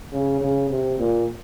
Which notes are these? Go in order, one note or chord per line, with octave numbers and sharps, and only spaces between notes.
C#3
C#3
C3
A#2